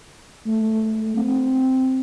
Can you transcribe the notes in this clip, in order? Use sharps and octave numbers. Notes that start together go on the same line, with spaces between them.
A3
C4